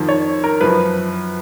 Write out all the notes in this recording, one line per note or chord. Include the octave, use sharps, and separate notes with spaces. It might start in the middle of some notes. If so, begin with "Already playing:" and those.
Already playing: F2 D#3
C#5
A#4
F#2 F3 B4